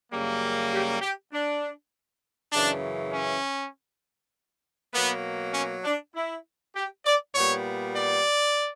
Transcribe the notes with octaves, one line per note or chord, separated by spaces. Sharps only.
F#2 C#3 G3 A#3
G4
G4
D4
F#2 C#3 E3 D4
C#4
B2 F#3 A#3 B3
C#4
D4
E4
G4
D5
A#2 G3 B3 C#5
D5